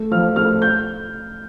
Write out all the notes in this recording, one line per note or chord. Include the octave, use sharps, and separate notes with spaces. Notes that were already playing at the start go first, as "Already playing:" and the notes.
Already playing: A3
F3 F6
A3 F6
G6